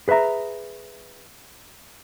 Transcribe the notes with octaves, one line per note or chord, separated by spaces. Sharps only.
G#4 B4 C5 E5 A#5